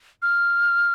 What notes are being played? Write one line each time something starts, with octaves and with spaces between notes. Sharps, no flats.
F6